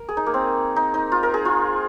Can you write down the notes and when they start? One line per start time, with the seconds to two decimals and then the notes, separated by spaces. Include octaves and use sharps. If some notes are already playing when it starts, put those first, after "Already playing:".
Already playing: A#4
0.09 G#4
0.17 D#4
0.26 A#3
0.34 C4
0.76 D#4
0.94 D#4
1.12 F4
1.23 A#4
1.34 G#4
1.45 F4